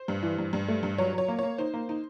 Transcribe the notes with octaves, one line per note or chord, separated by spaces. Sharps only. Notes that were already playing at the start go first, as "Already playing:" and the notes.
Already playing: C5
G2
E3
G2
G2
A3
G2
F#3 C#5
F#3
C#5
A#3
A#3 C#5
D#4 C5
A#3
D#4